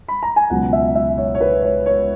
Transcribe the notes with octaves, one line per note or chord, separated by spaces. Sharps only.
B5
A#5
G#5
C#2 B2 F#3 F#5
E5
E5
C#5
C#5
B4
C#5
C#5